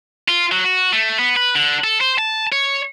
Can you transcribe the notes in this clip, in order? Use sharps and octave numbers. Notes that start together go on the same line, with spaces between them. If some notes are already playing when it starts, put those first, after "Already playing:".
F4
F#3
F#4
A3
B3
B4
D3
A4
C5
A5
C#5